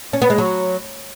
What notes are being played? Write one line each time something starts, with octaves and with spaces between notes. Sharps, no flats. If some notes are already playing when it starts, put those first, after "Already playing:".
C#4
B3
G#3
F#3